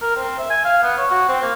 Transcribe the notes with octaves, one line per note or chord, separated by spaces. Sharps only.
A#4
C4
E5
G#5
F5
B3
C#5
F#4
C4
A#3